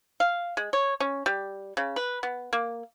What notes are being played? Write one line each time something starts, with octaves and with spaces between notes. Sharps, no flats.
F5
G#3
C#5
C#4
G3
C#3
B4
B3
A#3